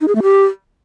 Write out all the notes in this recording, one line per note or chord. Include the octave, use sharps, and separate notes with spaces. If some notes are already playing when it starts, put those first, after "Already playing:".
D#4
G#4
A3
G4